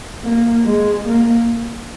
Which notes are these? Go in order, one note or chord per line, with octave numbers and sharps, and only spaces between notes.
A#3
G#3
A#3